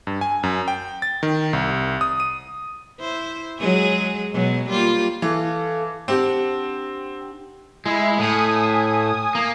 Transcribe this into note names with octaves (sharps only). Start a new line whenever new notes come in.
G2
G#5
F#2
G5
A6
D#3
C2
D#6
D#7
E4 C5
F#3 G#3 G#4
B2 F#3 G#3
G3 A#3 F4
E3 A4 F5
C4 D4 G4 F#5
G#3 E4
A2 G#5 D#6
A#3